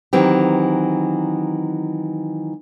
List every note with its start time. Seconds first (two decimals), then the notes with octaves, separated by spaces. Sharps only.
0.13 D#3 E3 F#3 C4 G4